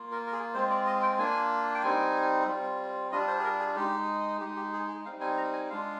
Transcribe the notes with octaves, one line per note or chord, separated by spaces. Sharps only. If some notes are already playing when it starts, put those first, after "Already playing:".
Already playing: A#3 F4
A#4
A#4
G#4
G#3 C4 F4 C5
D5
D#5
G5
A#3 D4 F4 G#5
G5
G3 C4 D#4 G#5
G3 C4 F4
G3 D4 F4 D#5
C5
G#4
A#4
G#4
G#3 D#4 G4
G#3 D#4 G4
G4
G#4
G#4
G3 C4 D#4 F5
G#5
A#5
G#5
G#3 D4 F4 F5